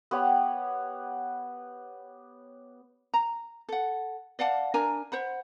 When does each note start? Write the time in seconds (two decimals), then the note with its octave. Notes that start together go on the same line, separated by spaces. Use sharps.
0.11 B3 G4 C#5
3.14 A#5
3.69 A4 F#5
4.39 D5 F5 F#5 A5
4.74 D4 A#4 G#5 A#5
5.12 C5 F#5 B5